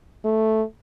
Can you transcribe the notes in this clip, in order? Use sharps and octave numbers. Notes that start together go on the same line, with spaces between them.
A3